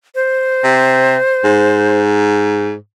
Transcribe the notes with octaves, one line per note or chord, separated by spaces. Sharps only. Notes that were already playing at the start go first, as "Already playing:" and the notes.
C5
C3
G#2